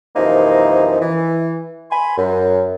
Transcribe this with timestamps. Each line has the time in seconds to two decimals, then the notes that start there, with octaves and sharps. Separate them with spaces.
0.15 F#2 C3 E3 F3 A#3 D#4
1.01 E3
1.91 G#5 B5 C6
2.17 F#2